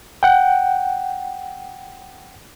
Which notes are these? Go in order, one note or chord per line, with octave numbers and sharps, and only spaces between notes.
F#5 G5